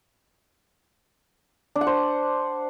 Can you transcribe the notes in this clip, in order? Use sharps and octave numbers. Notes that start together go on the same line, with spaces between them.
D4
F#5
C5